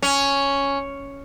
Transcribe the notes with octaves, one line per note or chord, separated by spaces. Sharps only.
C#4